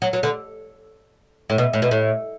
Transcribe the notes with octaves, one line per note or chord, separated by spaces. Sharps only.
F#3
F#3
D3
A2
B2
A2
B2
A2